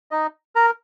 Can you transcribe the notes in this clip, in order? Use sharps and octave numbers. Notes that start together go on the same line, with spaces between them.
D#4 D#5
A#4 A#5